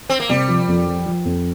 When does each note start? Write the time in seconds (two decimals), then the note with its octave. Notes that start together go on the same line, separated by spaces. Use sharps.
0.10 C4
0.20 A#3
0.29 C3 G3
0.48 F3
0.68 F2
0.87 F3
1.06 F3
1.25 F2